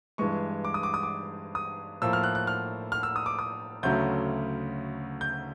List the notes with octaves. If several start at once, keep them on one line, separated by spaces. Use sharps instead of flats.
G2 E3 G#3 C#6
D6
D#6
D6
D#6
D6
D#6
A2 F3 A#3 E6
F6
F#6
F#6
F6
F6
E6
D#6
D6
D#6
D2 C#3 F#3 A3 G6
G6